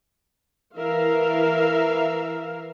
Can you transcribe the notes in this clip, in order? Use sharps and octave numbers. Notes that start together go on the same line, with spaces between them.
E3 A#4 E5 F5